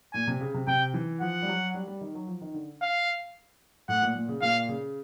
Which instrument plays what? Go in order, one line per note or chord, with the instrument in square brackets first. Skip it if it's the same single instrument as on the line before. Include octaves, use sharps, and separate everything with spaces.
[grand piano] A#2 [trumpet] G#5
[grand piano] C3
C#3
C3
[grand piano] C3 [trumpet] G5
[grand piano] E3
[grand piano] F3 [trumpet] F#5
[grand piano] G3
F#3
G3
G3
D#3
F#3
F3
D#3
D3
[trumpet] F5
[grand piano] A2 [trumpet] F#5
[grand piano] A#2
A#2
C#3
[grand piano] A#2 [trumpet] F5
[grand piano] C#3